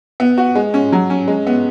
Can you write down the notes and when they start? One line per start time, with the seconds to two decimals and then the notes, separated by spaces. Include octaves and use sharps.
0.20 B3
0.38 F#4
0.55 G#3
0.74 C#4
0.92 F#3
1.10 C#4
1.28 G#3
1.47 B3